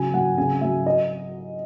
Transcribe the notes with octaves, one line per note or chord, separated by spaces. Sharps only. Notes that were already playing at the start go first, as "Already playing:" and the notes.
Already playing: C#3 F#3 G#5
F#3 F#5
C#3 G#5
F#3 E5
D#5